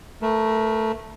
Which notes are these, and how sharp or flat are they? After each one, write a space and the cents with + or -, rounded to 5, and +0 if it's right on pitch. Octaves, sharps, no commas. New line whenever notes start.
A3 +5 A#4 +30